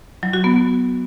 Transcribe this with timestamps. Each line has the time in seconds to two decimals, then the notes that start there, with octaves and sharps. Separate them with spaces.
0.23 F#3
0.33 F#4
0.44 B3